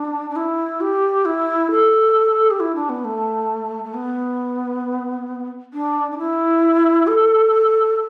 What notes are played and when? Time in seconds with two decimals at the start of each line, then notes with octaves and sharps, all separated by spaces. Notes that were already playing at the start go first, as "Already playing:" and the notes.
Already playing: D4
0.30 D4
0.36 E4
0.81 G4
1.25 E4
1.71 A4
2.51 G4
2.60 E4
2.75 D4
2.89 B3
3.05 A3
3.84 A3
3.94 B3
5.73 D4
6.11 D4
6.18 E4
7.07 A4